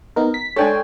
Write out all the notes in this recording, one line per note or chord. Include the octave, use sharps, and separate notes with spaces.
B3 D#4 A#4
B6
G#3 D4 A4 C#5 G5 G#5